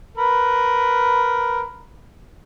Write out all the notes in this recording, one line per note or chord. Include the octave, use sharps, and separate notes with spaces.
A#4 B4 B5